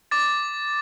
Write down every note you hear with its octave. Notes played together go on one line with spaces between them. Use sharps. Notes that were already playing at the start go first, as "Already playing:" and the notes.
D6 A6